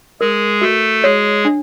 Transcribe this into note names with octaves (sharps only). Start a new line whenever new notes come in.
G#3 G#4 A#4
A3 F#4 A4
G#3 G#4 C#5
D4